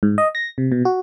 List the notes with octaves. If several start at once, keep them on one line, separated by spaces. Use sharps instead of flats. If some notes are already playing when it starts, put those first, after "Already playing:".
G#2
D#5
A#6
C3
B2
F#4